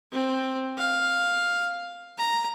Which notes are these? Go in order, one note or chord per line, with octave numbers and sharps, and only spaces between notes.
C4
F5
A#5